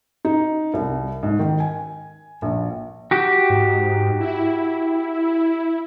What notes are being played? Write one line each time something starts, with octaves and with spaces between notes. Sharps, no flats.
D#4
C2
G#2
D#3
G#5
A#1
F#4 G4
G#2
E4